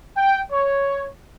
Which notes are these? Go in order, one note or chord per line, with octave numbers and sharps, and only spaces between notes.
G5
C#5